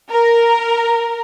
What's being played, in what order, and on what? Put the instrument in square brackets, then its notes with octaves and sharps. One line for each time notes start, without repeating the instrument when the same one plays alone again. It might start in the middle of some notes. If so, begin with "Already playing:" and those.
[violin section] A#4